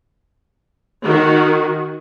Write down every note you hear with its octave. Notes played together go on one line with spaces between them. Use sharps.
D#3 F#4